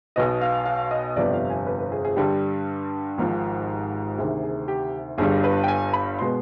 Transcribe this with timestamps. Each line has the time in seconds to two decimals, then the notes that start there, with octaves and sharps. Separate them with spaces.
0.16 B1 B2 B3 D#5
0.41 F5
0.66 F5
0.91 D#5
1.16 G1 F2 C3 G3 B3 D5
1.33 F5
1.50 G#5
1.67 B4
1.79 B4
1.92 G#4
2.05 G#4
2.16 G2 D3 G3 G4
3.18 G#1 G#2 F3
4.18 D2 C3 D#3 G#4
4.43 G#4
4.68 G4
5.18 G1 G2 D3 G3 G#4
5.44 B4
5.64 G5
5.68 G#5
5.93 B5
6.19 B2 G#3 B3 C6